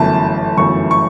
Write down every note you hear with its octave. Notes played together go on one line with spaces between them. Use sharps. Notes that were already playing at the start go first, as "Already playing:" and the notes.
Already playing: G1 F#2 E3 A3 A5
G1 F#2 E3 A3 C#6
C#6